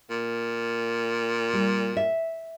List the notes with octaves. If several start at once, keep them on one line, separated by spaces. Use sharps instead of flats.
A#2
G3
E5